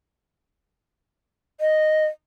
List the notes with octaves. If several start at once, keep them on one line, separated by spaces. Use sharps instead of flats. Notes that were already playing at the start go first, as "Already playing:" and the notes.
D#5